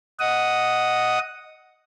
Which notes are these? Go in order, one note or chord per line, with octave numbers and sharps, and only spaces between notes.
D#5 F#5 D#6